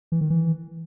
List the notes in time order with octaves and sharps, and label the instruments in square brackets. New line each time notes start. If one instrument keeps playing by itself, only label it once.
[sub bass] E3
D#3
E3